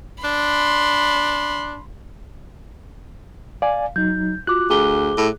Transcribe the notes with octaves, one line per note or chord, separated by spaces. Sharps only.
D4 B5 C6
D5 F5 G#5
F#3 D#4 G6
F4 F#4 D6 F#6
D2 G#4 D6 G7
A2